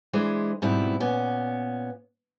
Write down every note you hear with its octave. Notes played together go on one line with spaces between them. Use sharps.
E3 G#3 D4 C5
G#2 B2 G3 C4 E4
A#2 B3 C#4